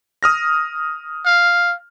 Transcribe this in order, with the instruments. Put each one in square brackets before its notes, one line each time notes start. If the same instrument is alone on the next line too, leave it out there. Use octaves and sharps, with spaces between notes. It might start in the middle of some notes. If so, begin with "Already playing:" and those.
[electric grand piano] D#6 F6 A#6
[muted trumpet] F5